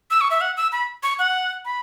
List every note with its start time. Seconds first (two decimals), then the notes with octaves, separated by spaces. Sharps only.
0.11 E6
0.21 C#6
0.31 E5
0.41 F#5
0.57 E6
0.72 B5
1.03 C#6
1.19 F#5
1.65 B5